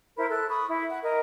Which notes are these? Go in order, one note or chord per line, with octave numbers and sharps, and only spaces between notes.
E4 A#4 C5 B5
A4 F#6
B5 C#6 D#6
E4
F#5
A#4 D#5